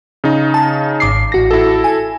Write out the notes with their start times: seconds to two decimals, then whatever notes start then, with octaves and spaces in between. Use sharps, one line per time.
0.24 C#3 D#4
0.54 A5
1.00 G#1 D6 C7
1.32 A1 F#4 A#6
1.51 E4 A4
1.84 G#5